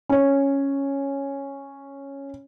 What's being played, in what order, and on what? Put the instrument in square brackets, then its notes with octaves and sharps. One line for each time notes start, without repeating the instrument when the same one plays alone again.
[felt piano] C#4 C#5